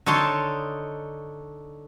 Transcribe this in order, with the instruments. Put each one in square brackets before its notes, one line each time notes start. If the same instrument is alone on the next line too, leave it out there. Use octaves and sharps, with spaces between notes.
[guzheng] D3 D#4 C#5 A5 C6